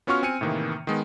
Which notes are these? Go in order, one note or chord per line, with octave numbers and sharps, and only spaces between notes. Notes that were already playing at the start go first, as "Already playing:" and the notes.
B3 C#4 F4 F#4 C#6 F6
C4 G#5 F6 C#7 D#7
A2 C3 D#3 E3 A#3
D#3 G#3 B3